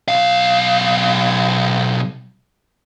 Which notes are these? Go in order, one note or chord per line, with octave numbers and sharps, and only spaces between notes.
B1 F5